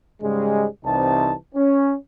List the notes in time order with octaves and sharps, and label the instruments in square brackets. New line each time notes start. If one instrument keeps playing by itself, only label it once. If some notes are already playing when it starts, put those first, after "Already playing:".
[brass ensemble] G#2 C#3 G3 G#3
C2 C3 E3 C4 D#4 A5
C#4